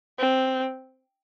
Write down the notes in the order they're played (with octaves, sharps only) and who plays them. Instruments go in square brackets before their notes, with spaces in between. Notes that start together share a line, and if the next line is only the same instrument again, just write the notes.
[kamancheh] C4